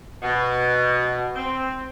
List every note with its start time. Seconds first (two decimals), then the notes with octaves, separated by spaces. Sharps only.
0.22 B2
1.36 C4